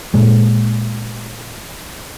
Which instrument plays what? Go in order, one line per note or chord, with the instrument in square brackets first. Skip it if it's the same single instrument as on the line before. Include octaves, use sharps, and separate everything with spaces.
[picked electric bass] A#2 G#3